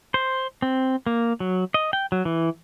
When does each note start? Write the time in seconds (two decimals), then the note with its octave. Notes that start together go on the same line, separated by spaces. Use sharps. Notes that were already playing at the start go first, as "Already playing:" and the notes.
0.14 C5
0.62 C4
1.06 A#3
1.40 F#3
1.74 D#5
1.93 G5
2.12 F#3
2.25 E3